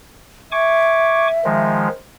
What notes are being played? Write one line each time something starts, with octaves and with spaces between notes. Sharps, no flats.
E5 G#5 C#6 D6
D#3 F3 G#3